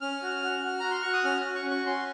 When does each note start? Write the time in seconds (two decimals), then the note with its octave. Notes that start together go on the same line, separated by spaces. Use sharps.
0.01 C#4 F6
0.22 F#4
0.43 F#4
0.63 F#4
0.80 F#4 A#5
0.91 C6
1.02 F#4 C#6
1.13 D#6
1.24 C#4 F6
1.45 F#4
1.55 C#6
1.65 C#4
1.71 C#6
1.86 C#4 C6